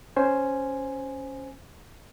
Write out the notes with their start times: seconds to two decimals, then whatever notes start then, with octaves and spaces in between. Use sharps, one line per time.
0.16 C#4 C5 G#5